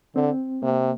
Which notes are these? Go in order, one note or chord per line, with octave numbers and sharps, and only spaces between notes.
D3 C4
C3 A#3